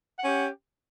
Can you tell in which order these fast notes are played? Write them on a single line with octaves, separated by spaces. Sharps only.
F#5 C#4 G4